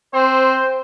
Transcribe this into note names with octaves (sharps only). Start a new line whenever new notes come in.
C4 C5